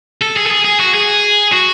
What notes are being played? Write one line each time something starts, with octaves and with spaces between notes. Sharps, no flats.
A4
G#4
A4
G#4
G#4
F#4
G#4
F#4